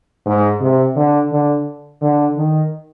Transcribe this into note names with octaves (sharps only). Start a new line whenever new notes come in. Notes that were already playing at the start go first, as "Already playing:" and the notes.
G#2
C3
D3
D3
D3
D#3